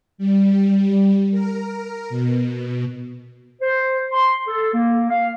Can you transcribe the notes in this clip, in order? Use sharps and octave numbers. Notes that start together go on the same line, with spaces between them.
G3
A#4
B2
C5
C6
A4
A#3
F5